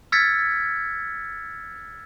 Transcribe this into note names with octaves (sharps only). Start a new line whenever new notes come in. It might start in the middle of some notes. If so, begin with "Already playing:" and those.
E6 F6 G#6 A6 B6 C#7